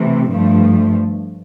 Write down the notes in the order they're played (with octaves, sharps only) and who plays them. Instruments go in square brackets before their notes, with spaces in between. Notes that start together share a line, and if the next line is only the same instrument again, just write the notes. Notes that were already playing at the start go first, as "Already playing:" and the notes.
Already playing: [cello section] C3 E3 A3
G2 F3 A3